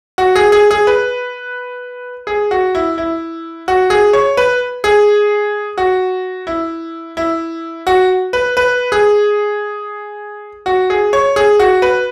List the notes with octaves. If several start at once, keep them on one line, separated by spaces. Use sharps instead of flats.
F#4
G#4
G#4
G#4
B4
G#4
F#4
E4
E4
F#4
G#4
C#5
B4
G#4
F#4
E4
E4
F#4
B4
B4
G#4
F#4
G#4
C#5
G#4
F#4
B4